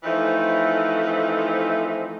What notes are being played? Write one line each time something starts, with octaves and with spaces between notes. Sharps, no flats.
E3 F3 A3 C4 D#4